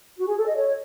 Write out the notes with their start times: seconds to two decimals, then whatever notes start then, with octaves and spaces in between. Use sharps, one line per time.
0.18 F#4
0.27 G#4
0.37 A4
0.47 D#5
0.56 C#5